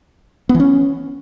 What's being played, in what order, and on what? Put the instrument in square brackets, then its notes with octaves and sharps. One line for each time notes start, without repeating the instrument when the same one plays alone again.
[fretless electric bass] B3
E3
C#4